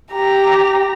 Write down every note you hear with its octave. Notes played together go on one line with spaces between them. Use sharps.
G4 A#5